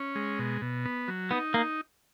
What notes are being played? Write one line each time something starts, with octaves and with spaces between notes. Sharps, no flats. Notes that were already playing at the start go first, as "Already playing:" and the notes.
Already playing: C#4
G#3
B2
B2
B3
F#3
B3 D#4
A#3